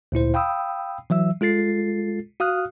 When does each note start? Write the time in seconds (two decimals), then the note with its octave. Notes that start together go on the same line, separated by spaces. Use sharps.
0.12 D2 A#2 E4 C5
0.34 F5 G5 B5 D#6 E6
1.10 E3 F#3 E5 E6
1.41 G#3 F4 A4 A6 C7
2.40 F#4 F5 D#6 F6 F#6